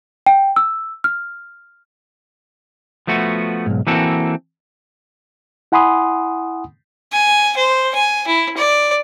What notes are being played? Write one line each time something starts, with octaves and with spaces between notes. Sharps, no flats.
G5
E6
F6
F3 A3 B3 F#4
B1 E2 G#2
E3 A#3 C4 F#4 A4
E4 F#5 G#5 B5 C6 D#6
G#5
C5
G#5
E4
D5